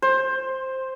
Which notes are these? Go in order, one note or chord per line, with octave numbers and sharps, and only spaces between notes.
C5